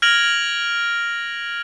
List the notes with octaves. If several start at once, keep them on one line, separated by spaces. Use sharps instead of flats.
F6 G#6 A#6 D7 F7 F#7